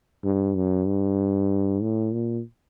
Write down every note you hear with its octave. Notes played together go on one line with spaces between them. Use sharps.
G2
F#2
G2
A2
A#2